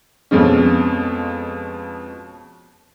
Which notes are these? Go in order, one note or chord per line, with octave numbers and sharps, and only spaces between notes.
F2 B2 F3 G#3 C#4